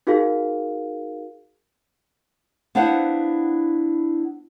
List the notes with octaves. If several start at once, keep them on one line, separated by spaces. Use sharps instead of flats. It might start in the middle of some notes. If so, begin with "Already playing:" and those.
D#4 F#4 G#4 A#4 F5
B3 D4 E4 C5 F5 F#5